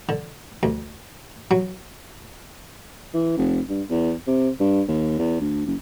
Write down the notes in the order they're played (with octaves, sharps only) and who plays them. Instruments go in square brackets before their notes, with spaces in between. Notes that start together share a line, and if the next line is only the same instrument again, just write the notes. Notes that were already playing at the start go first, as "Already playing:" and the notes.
[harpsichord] D3
D2
F#3
[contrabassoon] E3
F1
G2
E2
C3
G2
D#2
E2
D2
F#1